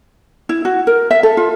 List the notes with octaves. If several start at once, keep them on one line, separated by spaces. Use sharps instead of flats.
E4
F#4
A#4
E5
A4
F4